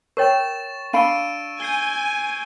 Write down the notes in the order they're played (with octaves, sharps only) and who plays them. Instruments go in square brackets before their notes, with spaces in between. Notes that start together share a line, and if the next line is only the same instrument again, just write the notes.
[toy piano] A#4 C#5 G5 [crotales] C#6 A6 E7
[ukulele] D4 F5 B5 [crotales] E6 D7 D#7
[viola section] G#5 [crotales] G6 C7 G7